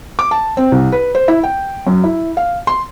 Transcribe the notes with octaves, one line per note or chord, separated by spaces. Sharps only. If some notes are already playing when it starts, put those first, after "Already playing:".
D6
A5
C4
C2
B4
C5
E4
G5
F#2
E4
F5
C6